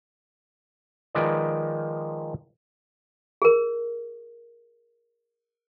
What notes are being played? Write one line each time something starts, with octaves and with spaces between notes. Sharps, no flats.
D#3 F3 G#3 B4 D5
G#4 A#4